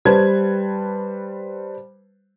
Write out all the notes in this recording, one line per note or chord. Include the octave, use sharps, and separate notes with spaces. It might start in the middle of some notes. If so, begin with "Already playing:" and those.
G3 B4 C5 A5 G#6